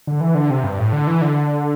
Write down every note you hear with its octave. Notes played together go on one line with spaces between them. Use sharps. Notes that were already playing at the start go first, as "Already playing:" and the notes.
D3
E3
D3
C3
G2
A2
D3
E3
D3